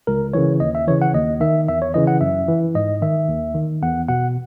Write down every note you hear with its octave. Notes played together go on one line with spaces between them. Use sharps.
C#2 A#4
C#3 E3 C#5
D#2 D#5
E5
C#3 E3 C#5
F#5
D#2 D#5
D#3 E5
E2 E5
C#5
C#3 E3 D#5
F#5
F#2 E5
E3
G#2 D#5
D#3 E5
D#2
D#3
E2 F#5
B2 F#5